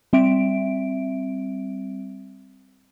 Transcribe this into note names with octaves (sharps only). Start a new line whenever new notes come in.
G3 C4 E5 D7